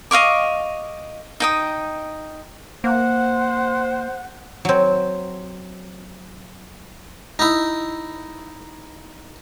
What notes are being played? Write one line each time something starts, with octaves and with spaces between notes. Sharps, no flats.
D#5 F5 C#6 D6
D#4 G5 D#6
A#3 C5 F#5
F#3 C4
D#4 E4